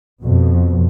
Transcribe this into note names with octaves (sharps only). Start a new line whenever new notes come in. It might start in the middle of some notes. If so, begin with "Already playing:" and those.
F2 B2